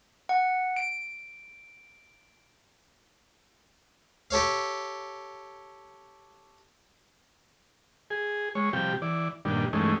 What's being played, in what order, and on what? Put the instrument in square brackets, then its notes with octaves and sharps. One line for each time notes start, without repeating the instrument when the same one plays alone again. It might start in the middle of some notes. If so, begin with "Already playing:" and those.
[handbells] F#5
D7
[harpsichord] G4 A4 C#5 F5
[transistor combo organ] G#4
G#3 C#5
C3 F3 G3 G4
E3 D5
G2 A#2 D#3 G3 D4
G2 E3 G#3 A3 C#4 D#4